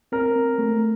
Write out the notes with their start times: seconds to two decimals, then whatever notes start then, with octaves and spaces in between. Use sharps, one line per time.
0.12 C4 A#4
0.36 C4
0.58 A3